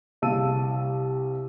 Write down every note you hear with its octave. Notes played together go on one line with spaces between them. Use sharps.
C2 F5 A5 E6 D#7